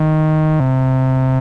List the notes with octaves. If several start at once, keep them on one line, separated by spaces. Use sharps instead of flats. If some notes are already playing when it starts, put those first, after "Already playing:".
Already playing: D#3
C3